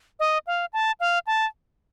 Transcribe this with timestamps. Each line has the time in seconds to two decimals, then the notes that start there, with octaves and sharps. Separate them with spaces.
0.20 D#5
0.47 F5
0.73 A5
1.00 F5
1.27 A5